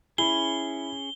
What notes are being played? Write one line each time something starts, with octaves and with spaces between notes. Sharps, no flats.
C#4 E4 G#4 G7